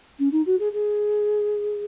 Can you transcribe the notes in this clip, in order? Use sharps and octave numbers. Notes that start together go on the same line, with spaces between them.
C#4
D#4
F#4
G#4
G#4